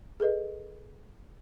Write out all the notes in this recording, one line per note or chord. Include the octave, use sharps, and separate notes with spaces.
G#4 A4 B4 D#5